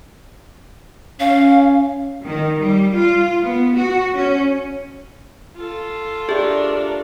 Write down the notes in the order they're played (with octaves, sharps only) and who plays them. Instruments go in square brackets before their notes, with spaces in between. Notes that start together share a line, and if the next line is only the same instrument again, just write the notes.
[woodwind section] C#4 [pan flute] F5
[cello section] D#3
G3
F4
B3
F#4
C#4
[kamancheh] F4 A4
[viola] D4 A#4 [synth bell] G4 E5 [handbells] G#4